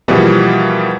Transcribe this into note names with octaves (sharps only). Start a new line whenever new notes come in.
B2 E3 F3 G3 A#3 G#4